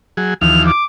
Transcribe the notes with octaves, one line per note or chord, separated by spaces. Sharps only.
F#3 G#4
D#2 E3 F3 F7
D6